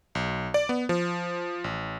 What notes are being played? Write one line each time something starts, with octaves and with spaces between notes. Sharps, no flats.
B1
D5
B3
F3
A1